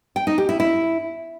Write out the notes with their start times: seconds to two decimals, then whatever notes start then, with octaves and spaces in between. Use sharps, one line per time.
0.16 G5
0.27 D#4
0.38 G4
0.49 E4
0.60 E4